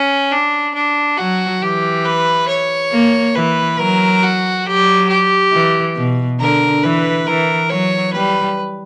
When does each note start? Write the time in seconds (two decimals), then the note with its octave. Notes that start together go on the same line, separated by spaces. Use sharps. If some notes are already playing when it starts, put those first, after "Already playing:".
Already playing: C#4
0.31 D4
0.74 D4
1.17 F#3 F#4
1.61 E3 G4
2.05 B4
2.48 C#5
2.92 A#3
3.35 E3 B4
3.78 F#3 A#4
4.22 F#4
4.66 F#3 G4
5.09 G4
5.53 E3
5.96 B2
6.39 D3 A#4
6.83 E3 B4
7.26 E3 A#4
7.69 F#3 C#5
8.13 G3 B4